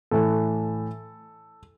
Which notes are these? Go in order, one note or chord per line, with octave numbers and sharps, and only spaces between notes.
A2 E3 A4